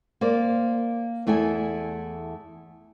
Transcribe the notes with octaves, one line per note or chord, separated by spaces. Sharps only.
A#3 C5 D5
E2 A3 E4 E5 G#5